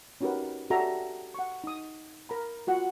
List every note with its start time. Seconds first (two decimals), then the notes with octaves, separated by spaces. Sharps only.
0.21 C#4 D#4 F#4 G4 A#4 B4
0.70 F#4 G4 A4 D5 E5 A#5
1.34 F#5 C#6
1.64 D#4 D#6
2.29 A#4 A#5 B5
2.67 F4 F#4 F#5